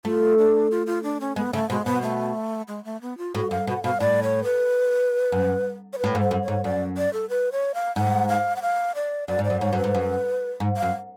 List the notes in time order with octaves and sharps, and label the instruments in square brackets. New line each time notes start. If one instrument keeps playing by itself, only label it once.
[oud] A3 [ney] F4
[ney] D4
F4
F4
D4
C#4
[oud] G#3 [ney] B3
[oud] C#3 [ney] A3
[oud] B2 [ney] G#3
[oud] B2 [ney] B3
[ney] A3
G#3
A3
B3
F4
[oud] A2 [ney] F#4
[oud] F#2 [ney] F5
[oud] B2 [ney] F#5
[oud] B2 [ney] F5
[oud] A2 [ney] D5
[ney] C#5
B4
[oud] F#2
[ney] C#5
B4
[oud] A2
G#2
[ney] A4
[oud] F#2
[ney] C#5
[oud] G#2
[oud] F#2 [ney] D5
[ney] D5
A4
B4
C#5
F5
[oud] G#2 [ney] F#5
[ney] F5
F#5
F5
D5
[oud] F#2 [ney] D5
[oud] G#2
[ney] D5
[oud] F#2
[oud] G#2 [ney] C#5
[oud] F#2 [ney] B4
[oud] G#2
F#2
G#2
[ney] F5
[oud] F#2